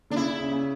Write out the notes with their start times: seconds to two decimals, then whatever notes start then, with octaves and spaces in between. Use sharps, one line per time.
0.10 D3 D4
0.16 C#3 E4
0.28 C#3
0.39 C#3
0.51 C#3